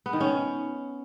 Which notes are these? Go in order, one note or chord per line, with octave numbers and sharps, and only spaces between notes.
B3
D#3
C#4